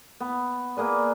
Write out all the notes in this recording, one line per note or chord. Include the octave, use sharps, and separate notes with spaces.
B3
A#3 G#4 B4 D5